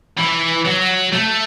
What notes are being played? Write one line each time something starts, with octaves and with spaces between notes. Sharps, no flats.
E3
F#3
A3